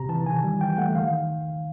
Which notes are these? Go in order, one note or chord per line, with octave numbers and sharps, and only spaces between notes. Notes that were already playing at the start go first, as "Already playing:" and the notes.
Already playing: C3 A#5
E3 A5
D#3 G#5
G3
E3 G5
A3 F#5
D#3 F5